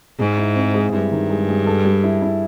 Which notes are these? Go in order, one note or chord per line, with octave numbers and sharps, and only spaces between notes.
G#2 G#3
E4
C4
G#3
G2 E4
D#3
G#3
G#3
A4
G3
E4
E4